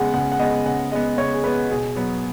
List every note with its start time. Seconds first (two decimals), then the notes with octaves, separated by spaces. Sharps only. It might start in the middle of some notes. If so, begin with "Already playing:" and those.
Already playing: C#3 G#3 B3 F#5
0.14 C#3 F#5
0.32 F#5
0.39 G#3 B3 D#5
0.66 C#3 F#5
0.92 G#3 B3 D#5
1.18 C#3 C#5
1.34 G#4
1.44 G#3 B3 B4
1.70 B2 G#4
1.96 F#3 B3